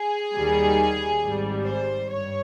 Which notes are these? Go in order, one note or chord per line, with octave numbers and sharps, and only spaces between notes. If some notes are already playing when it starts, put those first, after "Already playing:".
Already playing: G#4
D#2 D#3 G3
G#1 G#2 G3
C5
G2 C#5